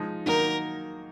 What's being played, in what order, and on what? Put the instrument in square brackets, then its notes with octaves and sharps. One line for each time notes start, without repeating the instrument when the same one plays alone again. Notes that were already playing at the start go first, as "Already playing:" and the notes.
Already playing: [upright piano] F3 G#3 D#4
[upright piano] D#3 F#3 A#3 D#4 [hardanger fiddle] A#4